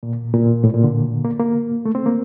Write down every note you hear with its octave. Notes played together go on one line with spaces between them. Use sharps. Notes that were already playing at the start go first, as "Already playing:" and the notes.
A#2
A#2
A2
A#2
D3
A#3
A#3
A3
C4
A#3